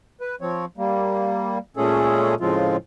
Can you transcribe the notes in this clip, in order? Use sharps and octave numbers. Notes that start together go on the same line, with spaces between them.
B4
F3 C4 C#5
G3 A#3
A#2 G#3 A3 C#4 G#4 A4
A2 C#3 F3 G#3 C4 F4